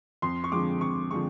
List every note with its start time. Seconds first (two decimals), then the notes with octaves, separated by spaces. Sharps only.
0.22 F2 C6
0.44 C#6
0.52 D3 F3 G#3 C4 D6
0.81 F2 C#6
1.11 D3 F3 G#3 C4 C#6